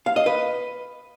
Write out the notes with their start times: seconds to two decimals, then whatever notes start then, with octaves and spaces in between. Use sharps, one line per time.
0.06 F5
0.16 D#5
0.26 B4